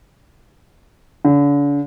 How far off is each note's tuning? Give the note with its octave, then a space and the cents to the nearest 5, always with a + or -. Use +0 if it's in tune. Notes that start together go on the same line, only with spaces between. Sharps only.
D3 -40